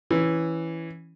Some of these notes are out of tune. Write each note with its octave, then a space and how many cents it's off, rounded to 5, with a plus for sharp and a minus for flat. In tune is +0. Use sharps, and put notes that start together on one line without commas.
E3 +0 C#4 +0